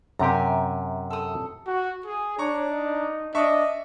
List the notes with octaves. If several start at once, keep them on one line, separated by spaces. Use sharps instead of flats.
F#2 C3 G4 G#5 A#5
A4 D#6
F#4
G#4
D4 C#5 A#5 C#6
D#4
D4 D#5 E5 C#6